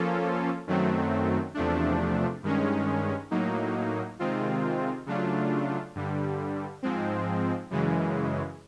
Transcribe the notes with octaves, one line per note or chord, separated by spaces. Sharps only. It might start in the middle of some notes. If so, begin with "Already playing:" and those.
Already playing: F3 A#3 C#4 F4 A4
F#2 D#3 F#3 A3 C4
E2 C3 F3 A3 D4
G2 D#3 G#3 C#4
A2 F#3 A#3 D#4
C3 D#3 G#3 C4 F4
C#3 F#3 A3 D4 F4
G2 D3 G3
G#2 F3 G#3 C4
F#2 C#3 E3 G#3